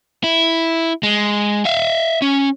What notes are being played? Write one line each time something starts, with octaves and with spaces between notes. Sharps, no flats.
E4
G#3
E5 F5
C#4